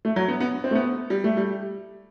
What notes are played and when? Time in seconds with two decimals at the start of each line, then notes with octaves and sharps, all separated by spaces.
0.05 A3
0.16 F#3
0.28 B3
0.40 B3
0.64 C4
0.71 A3
0.75 B3
1.10 G3
1.24 A3
1.37 G3